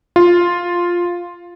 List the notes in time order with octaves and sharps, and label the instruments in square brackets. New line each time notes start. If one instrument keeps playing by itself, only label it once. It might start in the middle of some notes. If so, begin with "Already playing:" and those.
[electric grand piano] F4